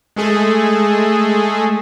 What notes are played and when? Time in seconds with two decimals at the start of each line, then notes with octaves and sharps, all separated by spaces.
0.16 G#3 A3 G#4 A4